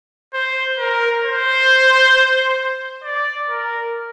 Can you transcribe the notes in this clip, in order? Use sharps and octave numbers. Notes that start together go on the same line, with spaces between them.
C5
A#4
C5
D5
A#4